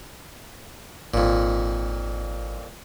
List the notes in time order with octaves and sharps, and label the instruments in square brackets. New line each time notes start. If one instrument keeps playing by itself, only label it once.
[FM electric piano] G#1 [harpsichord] F2 A#2